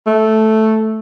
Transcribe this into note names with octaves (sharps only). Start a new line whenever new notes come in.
A3